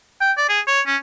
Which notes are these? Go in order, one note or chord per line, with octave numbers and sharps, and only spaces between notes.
G5
D5
G#4
C#5
C#4